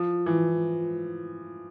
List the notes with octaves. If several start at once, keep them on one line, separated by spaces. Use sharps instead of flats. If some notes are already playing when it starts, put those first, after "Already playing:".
Already playing: F3
E3